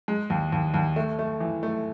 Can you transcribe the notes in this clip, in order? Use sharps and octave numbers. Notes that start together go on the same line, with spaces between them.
G#3
D#2
D#2
D#2
A3
A3
E3
A3